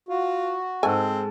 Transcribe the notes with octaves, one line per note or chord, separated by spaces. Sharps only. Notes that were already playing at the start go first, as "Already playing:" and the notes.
F4 F#4
G#2 C4 A4 G#5